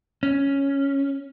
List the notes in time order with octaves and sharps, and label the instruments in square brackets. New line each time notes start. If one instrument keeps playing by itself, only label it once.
[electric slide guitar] C#4